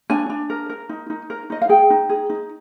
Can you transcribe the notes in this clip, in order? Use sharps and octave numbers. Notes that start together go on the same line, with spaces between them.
D4 G#5
D4
A#4
A#4
D#4
D#4
A#4
D#4 D#5
F5
G#4 G5
D#4
G#4
D#4